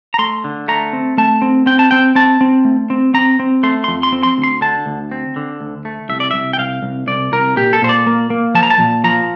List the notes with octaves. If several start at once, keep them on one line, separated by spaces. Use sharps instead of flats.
A#5
A3 C6
D3
A3 A#5
C4
A3 A5
C4
C4 G5
A5
C4 G5
C4 A5
C4
A3
C4
C4 A#5
C4
A3 C6
F2 C6
C6
C4
C6
D2
C6
D3 A5
D2
C4
D3
D2
A3
C2 E5
D5
C2 E5
G5
C2 F5
C2
C2 D5
C2 A#4
A#2 G4
A4
A#2 C5
D5
A#3
A#3
F3 A5
A#5
A5
A#2
F3 A#5